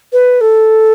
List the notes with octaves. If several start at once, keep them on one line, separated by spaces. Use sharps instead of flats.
B4
A4